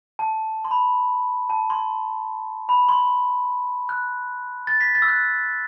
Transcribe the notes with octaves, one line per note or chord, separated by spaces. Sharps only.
A5
C6
B5
A5
C6
B5
C6
F#6
A6
B6
A6
E6
F#6